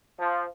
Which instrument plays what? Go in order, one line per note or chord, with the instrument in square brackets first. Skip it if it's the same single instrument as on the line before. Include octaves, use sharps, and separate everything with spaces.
[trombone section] F3